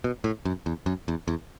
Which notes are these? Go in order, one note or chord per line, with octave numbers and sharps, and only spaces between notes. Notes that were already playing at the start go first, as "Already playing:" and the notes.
B2
A2
F#2
E2
F#2
E2
E2